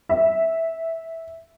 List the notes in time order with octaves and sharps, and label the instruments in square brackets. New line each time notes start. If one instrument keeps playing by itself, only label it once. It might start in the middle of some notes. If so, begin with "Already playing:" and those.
[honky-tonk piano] E5